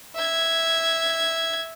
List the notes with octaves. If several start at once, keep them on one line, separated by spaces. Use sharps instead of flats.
E5 G#6